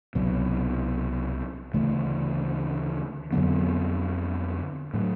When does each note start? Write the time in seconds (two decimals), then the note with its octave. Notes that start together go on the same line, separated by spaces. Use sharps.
0.15 C2 B2 F#3
1.74 D2 C#3 E3 A3
3.32 F2 D3 F#3 B3
4.94 A2 F#3